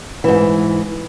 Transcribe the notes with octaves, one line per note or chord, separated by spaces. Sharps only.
G#2 E3